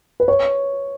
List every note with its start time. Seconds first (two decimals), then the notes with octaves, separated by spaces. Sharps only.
0.20 B4
0.28 C#5